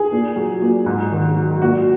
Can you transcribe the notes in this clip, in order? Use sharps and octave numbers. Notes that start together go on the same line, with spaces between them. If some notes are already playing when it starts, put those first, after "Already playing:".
Already playing: G#4
A#2
F#3
A#2
G#2
D#3
F#3
A#2 F#4